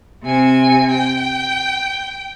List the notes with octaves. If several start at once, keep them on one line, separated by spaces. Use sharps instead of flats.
C3 G#5
G5